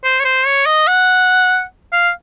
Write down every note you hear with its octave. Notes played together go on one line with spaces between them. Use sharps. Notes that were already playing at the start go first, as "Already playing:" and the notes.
C5
C#5
C5
C#5
D#5
F#5
F5